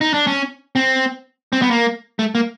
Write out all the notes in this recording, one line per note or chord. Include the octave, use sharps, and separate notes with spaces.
D#4
D4
C#4
C4
C4
B3
A#3
A3
A#3